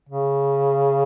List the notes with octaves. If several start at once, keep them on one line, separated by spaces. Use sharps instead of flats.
C#3